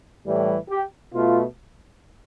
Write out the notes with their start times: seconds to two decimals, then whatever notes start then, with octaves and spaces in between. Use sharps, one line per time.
0.26 A2 E3 G3
0.70 G4
1.13 B2 A3 F4